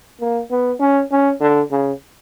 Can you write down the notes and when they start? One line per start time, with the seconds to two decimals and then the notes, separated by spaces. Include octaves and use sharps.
0.21 A#3
0.51 B3
0.80 C#4
1.11 C#4
1.41 D3
1.71 C#3